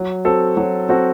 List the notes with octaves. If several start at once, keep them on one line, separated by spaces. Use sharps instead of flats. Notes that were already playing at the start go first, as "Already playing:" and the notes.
Already playing: F#3
C4 F#4 A4
F#3
C4 F#4 A4